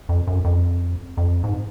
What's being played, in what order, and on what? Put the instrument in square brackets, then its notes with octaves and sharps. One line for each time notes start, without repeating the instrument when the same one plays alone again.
[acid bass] F2
F#2
F2
F2
G#2